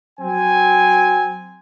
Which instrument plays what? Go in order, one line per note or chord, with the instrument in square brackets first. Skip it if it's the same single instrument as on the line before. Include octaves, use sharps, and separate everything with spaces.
[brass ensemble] F#3 C4 G#5